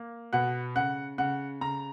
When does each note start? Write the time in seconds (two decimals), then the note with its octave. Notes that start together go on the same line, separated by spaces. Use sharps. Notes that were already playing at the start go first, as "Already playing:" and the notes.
Already playing: A#3
0.33 B2 F#5
0.75 C#3 F#5
1.18 C#3 F#5
1.61 C#3 A#5